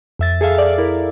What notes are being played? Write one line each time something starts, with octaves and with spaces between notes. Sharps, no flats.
F2 E5 A6
G#4 A4 E5 F5
D5
E4 A#4